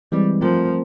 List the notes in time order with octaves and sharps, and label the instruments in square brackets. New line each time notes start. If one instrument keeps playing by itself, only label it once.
[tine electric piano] E3 G#3 C4 [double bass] G3
[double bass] F3 [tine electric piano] A3 C4 F4 A#4